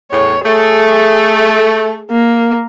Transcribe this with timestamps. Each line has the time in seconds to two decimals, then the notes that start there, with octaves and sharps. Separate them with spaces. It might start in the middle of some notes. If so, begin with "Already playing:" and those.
0.11 E2 A2 C#5
0.46 A3 G#4
2.11 A#3